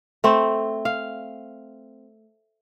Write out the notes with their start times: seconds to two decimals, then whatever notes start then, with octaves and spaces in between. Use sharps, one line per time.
0.24 A3 C4
0.85 F5